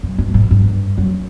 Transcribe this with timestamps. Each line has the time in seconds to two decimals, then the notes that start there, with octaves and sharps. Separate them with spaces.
0.03 F#2
0.18 G2
0.34 G#2
0.51 G2
0.98 F#2